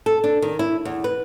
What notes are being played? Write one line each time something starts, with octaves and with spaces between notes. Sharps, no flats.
A4
D4
D#3
E4
E2
B4